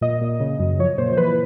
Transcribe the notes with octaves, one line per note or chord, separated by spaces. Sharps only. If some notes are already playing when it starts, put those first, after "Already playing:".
A#2 D#5
A#2
C#3
F#2
F3 C#5
A#2 C5
C5
E3 B4